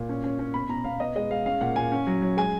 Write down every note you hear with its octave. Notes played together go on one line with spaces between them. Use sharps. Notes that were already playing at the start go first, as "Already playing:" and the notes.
Already playing: A#2
C#4
C#4
C#4
B2 B5
B2 A#5
B2 F5
B3 D#5
G#3 D#5
G#3 F5
C#4 F5
A#2 F#5
A#2 G#5
C#4
F#3
F#3
G#3 G#5